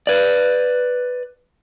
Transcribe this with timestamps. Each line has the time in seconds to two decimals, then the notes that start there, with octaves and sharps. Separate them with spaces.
0.07 B4 D5